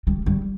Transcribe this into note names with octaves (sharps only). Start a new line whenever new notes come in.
G3
G3